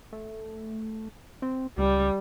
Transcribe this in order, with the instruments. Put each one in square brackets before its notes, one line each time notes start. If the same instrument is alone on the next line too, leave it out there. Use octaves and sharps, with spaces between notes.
[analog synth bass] A3
C4
[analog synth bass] C#2 [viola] G3